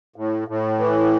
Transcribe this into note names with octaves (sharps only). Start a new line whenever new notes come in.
A2
A2
E3